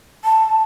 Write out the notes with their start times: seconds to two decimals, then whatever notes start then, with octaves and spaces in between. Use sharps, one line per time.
0.24 A5